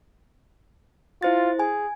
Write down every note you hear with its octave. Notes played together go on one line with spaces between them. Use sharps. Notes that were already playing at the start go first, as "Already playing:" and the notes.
E4 F4 C5 A6
G#4 G#5